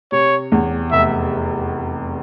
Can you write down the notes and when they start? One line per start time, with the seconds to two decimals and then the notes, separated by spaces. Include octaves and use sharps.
0.12 C3 C#5
0.52 E2
0.92 F1 E5